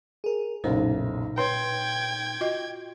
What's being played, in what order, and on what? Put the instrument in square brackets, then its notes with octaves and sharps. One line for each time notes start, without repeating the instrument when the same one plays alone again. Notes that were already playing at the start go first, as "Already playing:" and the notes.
[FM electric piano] G#4 A#4
[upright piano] F#1 B1 [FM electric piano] A#2 D#4 [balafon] C5
[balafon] B4 C#5 [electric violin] G5 G#6 [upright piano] C6
[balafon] F4 F#4 D#5